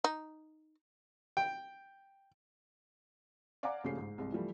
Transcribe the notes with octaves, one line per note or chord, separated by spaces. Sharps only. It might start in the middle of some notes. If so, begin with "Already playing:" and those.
D#4
G5
D5 F5 F#5 G#5 A#5 D6
A#1 C#3 A3 G4 C7
G#2
C2 G#3
E3 F3 G3 A3